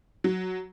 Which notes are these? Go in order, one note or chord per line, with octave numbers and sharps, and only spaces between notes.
F#3